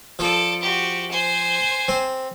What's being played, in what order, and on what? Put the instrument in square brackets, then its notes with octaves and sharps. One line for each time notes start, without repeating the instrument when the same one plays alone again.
[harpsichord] F3 [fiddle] A4 D5
[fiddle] F#4 G4
C5 G#5
[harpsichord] C4